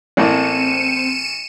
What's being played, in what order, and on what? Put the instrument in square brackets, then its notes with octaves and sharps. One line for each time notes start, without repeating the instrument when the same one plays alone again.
[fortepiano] A1 A2 A#3 [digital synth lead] C4 [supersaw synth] C#7 D#7 E7